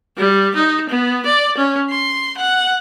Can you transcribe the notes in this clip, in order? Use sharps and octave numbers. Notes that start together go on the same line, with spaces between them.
G3
D#4
B3
D5
C#4
C6
F#5